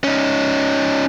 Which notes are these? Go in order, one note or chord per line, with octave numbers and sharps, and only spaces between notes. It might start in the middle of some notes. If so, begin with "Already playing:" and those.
C#4 D#4